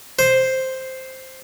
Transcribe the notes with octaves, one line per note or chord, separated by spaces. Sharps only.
C5